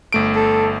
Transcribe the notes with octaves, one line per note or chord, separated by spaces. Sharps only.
G1 A3 D7
A4